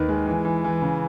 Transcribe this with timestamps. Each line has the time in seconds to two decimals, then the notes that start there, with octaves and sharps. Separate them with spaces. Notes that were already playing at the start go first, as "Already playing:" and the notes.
Already playing: D#2 D#3 B4
0.09 G#3
0.27 E3
0.45 E3
0.64 E3
0.82 C#3